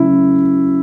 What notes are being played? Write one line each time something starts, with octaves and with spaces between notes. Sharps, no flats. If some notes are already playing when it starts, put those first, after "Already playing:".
Already playing: C#3 F#3 A3 E4